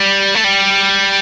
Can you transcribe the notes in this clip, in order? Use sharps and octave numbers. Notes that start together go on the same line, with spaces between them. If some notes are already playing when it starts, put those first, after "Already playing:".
Already playing: G3
A3
G3